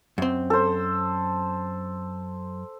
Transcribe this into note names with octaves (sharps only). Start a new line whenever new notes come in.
F#2 C4
A4 C5